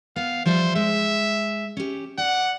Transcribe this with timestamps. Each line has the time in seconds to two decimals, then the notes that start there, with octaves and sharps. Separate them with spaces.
0.16 B3 F5
0.46 F3 G3 C5 E5
0.75 G#3 E5
1.77 C#4 G4
2.18 D5 F#5